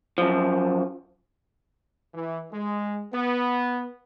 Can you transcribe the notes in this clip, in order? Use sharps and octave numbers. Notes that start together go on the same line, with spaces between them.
F#2 F3
E3
G#3
B3